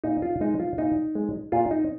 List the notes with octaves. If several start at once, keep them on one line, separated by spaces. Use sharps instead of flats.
A#2 D#4
F4
G#3 D#4
F4
A#2 D#4
G#3
A#2 F4
D#4